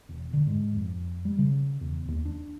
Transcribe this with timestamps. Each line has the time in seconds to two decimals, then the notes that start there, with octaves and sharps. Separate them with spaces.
0.09 E1
0.33 D3
0.47 G#2
0.75 F2
1.25 G3
1.38 C#3
1.81 E2
2.08 D#2
2.25 D4